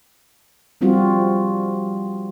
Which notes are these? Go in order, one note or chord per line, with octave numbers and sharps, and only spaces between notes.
F3 G3 C4 F4 F#4